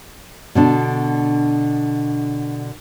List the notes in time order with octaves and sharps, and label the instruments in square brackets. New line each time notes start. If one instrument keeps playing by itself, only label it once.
[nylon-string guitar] B2 D3 D4